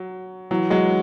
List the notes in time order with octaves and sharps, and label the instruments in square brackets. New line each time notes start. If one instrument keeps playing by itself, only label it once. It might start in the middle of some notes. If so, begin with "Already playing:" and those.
Already playing: [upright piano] F#3
E3 F#3
F#3 G#3